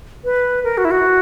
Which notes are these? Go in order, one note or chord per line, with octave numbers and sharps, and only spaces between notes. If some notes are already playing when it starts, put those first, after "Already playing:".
B4
A#4
F#4
E4
F#4